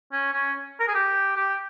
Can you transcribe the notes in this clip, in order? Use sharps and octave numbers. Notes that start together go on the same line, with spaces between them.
C#4
C#4
A#4
G#4
G4
G4